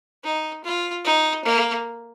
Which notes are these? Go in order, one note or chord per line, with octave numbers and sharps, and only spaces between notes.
D#4
F4
D#4
A#3